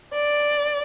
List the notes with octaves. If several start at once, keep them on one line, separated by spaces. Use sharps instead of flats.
D5